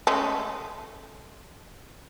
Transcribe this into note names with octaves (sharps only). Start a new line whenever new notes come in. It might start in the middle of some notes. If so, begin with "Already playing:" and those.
G#3 A3 C#4